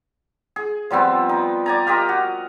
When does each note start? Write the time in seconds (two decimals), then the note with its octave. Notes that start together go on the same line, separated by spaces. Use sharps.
0.56 G#4
0.91 F3 G3 B3 C4
1.29 D#4
1.66 D5 G#5 A#5
1.87 F4 G4 A#4 D#5
2.09 F#4